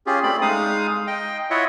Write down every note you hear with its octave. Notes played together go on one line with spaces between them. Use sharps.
C#4 F4 G4 G#4
A3 C4 D5 B5
G#3 D#4 F5 D#6
D#5 G5
E4 F4 C#5 D#5 E5 F#5